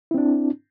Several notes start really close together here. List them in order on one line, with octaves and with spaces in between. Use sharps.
E4 C4 D4